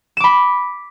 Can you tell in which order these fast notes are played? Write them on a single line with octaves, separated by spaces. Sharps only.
E7 D6 B5